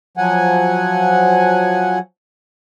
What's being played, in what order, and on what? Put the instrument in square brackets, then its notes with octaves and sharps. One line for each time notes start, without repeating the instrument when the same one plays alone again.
[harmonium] F3 F#3 F#5 G#5